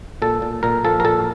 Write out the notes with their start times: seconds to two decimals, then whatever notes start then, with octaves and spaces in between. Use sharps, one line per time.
0.22 A#2 A4
0.42 A#2
0.63 A#2 A#4
0.84 F3 A4
1.00 A#4
1.04 A#2 A4